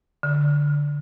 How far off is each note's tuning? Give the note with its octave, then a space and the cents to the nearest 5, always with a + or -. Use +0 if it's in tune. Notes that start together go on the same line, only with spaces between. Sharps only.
D3 -10